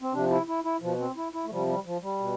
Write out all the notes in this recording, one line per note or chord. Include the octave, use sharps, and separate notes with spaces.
C4
C3 F3 D4
E4
E4
E4
B2 F3
C4
E4
E4
A3
C3 F3 G3
G3
F3
G3
B2